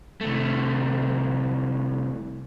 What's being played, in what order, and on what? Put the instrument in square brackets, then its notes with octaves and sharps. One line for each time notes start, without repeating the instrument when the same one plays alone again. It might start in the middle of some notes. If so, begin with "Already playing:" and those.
[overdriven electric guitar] C2 A3